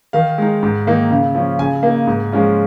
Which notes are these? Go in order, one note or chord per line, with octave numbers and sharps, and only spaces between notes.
D#3 F5
G#3 D#4
G#2
D#3 A#3 D#4
C#3
F3 C#4
C#3 G#5
A#3 D#4
G#2
F3 G#3 C#4 F4